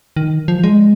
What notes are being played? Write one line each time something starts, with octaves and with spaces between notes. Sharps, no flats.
D#3
F3
G#3